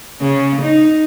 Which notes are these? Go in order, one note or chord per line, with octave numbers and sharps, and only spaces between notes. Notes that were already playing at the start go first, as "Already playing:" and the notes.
C#3
D#4